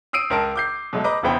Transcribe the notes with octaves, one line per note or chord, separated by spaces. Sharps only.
D#6 E6 C7 D7 D#7
C#2 A#4 A5 D7
D6 G6 C7
B2 F#3 G#3 A3
B4 D#5 A#5 D6
E1 C#3 E3 B3 C5 G5